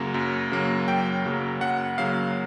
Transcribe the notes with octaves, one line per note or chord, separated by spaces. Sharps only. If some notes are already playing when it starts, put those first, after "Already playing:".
Already playing: F#2 C#3 F#3 A#3
F#2
C#3 F#3 A#3
F#2 G5
C#3 F#3 A#3
F#2 F#5
C#3 F#3 A#3 F5